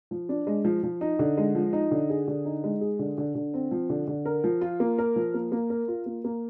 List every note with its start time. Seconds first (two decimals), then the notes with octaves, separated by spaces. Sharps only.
0.11 F3
0.29 D4
0.47 G#3
0.65 F3
0.83 F3
1.01 D#4
1.19 D3
1.38 G#3
1.55 F3
1.73 D#4
1.91 D3
2.10 G#4
2.28 D3
2.45 D#4
2.64 G#3
2.81 G#4
2.99 D3
3.18 D3
3.35 D3
3.54 C4
3.71 F3
3.90 D3
4.07 D3
4.26 A#4
4.44 F3
4.61 F4
4.80 A#3
4.99 A#4
5.16 F3
5.34 A#3
5.52 A#3
5.70 A#4
5.88 F4
6.06 A#3
6.24 A#3